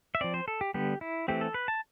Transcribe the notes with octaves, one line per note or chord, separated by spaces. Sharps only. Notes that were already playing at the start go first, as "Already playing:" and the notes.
E5
F3 C4 D5
C5
A4
G4
D3 G3 B3 G4
E4
E3 A3 C4 G4
A4
B4
A5